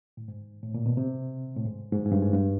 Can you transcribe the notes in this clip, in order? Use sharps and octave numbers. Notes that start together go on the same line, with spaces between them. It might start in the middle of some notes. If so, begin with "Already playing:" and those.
A2
G#2
A2
A#2
B2
C3
A2
G#2
G#2
G2
G#2
G2
G#2
G2